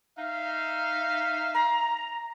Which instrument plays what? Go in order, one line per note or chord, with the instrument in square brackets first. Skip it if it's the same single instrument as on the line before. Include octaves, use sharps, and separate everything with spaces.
[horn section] D#4 E5 F5
[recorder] A#5